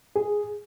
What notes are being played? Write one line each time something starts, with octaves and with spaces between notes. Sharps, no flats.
G#4